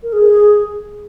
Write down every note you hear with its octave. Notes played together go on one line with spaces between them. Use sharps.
A#4
G#4